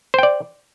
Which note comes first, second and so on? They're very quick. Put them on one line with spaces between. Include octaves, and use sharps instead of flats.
C5 G5 D5